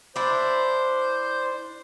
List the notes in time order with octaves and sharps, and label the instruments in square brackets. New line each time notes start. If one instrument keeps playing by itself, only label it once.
[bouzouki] D4 E4 [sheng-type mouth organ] C5